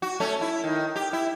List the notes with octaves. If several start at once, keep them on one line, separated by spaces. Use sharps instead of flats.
F#4
A3 C#4
E4
D#3
G4
E4